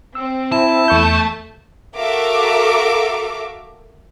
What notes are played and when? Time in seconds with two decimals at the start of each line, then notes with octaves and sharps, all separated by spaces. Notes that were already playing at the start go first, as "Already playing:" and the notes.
0.15 C4 E6
0.52 E4 A5
0.88 E2 A3 C#6 G6
1.96 F#4 A4 A#4 E5 F5 D6